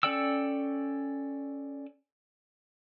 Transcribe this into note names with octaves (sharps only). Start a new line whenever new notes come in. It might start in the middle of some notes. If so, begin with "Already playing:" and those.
C#4 A4 D5 G5 E6